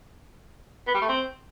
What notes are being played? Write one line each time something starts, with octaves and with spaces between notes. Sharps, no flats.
B3
G3
A3
C4